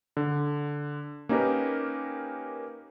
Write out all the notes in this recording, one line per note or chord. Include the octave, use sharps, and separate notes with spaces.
D3
A#3 C#4 D#4 G4 A#4 B4